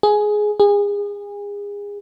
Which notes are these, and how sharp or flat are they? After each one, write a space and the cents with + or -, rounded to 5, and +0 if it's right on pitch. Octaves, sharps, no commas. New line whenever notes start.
G#4 +10
G#4 -30